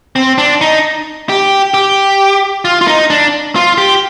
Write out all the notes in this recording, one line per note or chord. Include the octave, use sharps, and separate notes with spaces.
C4
D4
D#4
G4
G4
F4
F4
D#4
D4
F4
G4